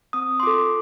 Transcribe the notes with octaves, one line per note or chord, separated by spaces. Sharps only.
C4 D#6
C6
F4 A4 D6